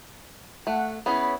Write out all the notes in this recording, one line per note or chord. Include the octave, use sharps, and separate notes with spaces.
A3 F#5
B3 C#4 E4 G#4 B5